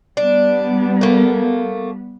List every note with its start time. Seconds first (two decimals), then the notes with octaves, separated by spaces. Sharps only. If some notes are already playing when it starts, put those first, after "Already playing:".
0.17 G3 B3 D4
1.01 A3 A#3